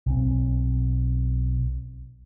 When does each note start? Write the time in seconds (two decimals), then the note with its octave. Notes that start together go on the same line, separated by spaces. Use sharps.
0.06 B1 C4